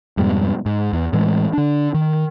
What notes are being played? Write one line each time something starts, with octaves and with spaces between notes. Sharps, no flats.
F2 G#2 B2 G3
G#2
E2
A2 E3 G#3
D3 D4
D#3